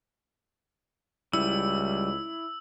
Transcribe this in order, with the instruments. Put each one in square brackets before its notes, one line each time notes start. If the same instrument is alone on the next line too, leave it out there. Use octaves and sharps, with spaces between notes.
[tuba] C#2 [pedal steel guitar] G3 [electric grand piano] E4 [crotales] E6